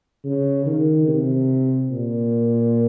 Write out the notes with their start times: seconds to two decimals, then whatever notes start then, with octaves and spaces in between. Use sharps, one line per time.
0.24 C#3
0.66 D#3
1.08 C3
1.91 A#2